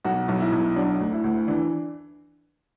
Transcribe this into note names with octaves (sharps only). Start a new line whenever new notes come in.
B1 F#4
B1
E4
B1
F#3 D4
D2
E4
D2
E3 D4